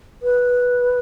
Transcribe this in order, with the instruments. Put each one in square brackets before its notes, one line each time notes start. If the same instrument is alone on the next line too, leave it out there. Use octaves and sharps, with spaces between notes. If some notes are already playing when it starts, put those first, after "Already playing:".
[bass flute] B4